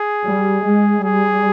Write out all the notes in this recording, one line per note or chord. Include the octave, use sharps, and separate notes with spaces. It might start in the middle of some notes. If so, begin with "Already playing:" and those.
Already playing: G#4
G3
G#3
G3 G#4